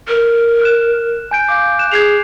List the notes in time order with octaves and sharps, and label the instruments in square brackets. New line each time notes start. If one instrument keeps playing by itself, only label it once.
[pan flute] A#4
[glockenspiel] F6 F#6 E7
G#5 G6 D7
[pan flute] F5 [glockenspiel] D6 G6
[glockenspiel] F#6 E7
[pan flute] G#4 [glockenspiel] G#6 C7 F7